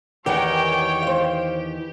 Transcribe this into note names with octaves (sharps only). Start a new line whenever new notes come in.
E2 D#3 E3 G4 A#4 C#5 F#5 G5
C5 F5